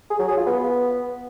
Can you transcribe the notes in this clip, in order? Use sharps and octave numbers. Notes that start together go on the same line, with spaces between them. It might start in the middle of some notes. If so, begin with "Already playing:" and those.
G#4
F#3
G#4
F4
B3